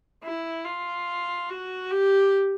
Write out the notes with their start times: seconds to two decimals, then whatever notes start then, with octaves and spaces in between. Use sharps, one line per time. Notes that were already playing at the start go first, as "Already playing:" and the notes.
0.23 E4
0.65 F4
1.50 F#4
1.91 G4